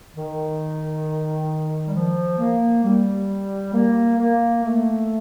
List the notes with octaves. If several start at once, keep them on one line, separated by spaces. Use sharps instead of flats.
D#3
G3
F3
A#3
G3
A#3
A#3
A3